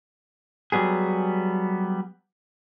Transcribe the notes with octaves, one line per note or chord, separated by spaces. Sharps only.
F#3 G3 B3 G#4